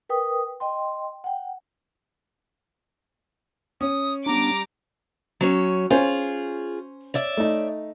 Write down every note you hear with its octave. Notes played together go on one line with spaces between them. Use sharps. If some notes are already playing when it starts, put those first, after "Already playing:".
A#4 B4 G5 D#6
D#5 G5 C6
F#5 G5
C#4 D#6
G3 B3 D4 A#5 D6
F#3 C#4 C#5
C#4 F4 G#4 C5 G#5
C#5 D5 E5
A3 D#4